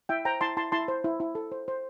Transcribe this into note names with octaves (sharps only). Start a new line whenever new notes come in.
E4 E5 G5
C5 G5 A#5
E4 A5 C6
E4 A5 C6
E4 A5 C6
C5
E4
E4
A4
C5
C5